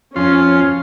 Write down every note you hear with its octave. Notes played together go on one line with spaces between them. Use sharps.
F2 C#4 F4 C6